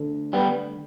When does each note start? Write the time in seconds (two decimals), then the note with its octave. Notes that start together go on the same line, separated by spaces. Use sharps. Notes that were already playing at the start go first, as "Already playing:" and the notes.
Already playing: D2 D3
0.33 G3 B3